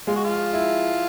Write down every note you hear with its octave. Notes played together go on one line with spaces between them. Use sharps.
G#3 F4
F#4
F3 F4
E4